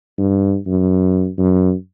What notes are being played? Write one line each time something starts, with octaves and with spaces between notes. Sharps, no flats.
G2
F#2
F#2